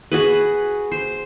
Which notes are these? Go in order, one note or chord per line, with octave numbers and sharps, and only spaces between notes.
F#4 G#4 B4
C5